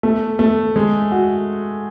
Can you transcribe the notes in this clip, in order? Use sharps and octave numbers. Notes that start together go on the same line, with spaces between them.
A3
A3
G#3
F#4